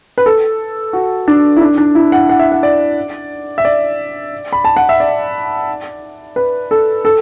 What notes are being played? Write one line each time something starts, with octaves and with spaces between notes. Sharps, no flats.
B4
A4
F#4
D4
E4
D4
D4
E4
F#5
F#5
E5
F#5
D5
E5
D5
B5
A5
F#5
E5
D5
B4
A4
A4